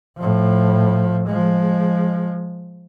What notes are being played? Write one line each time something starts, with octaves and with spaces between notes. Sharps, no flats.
A2 F3
F3 G#3